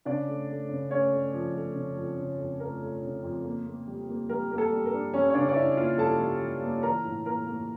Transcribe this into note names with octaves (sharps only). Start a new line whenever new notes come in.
C#3 D4 D5
A3
A3
C#3
A3 C#4 C#5
A3
F3
A3
C#3
F2
C#3
F2
A3 A#4
A3
C#3
F2
A#3
A#3
G3
A#3
G3 A#4
A#3 A#4
A4
G3
A#4
D4
G3 C#4 C#5
C#5
C#3 D4 D5
D5
C#3 E4 E5
A#3 F4 F5
G3 A4 A5
G3
G3
A#3
E3 A#4 A#5
A2
A#3 A#4 A#5
A#3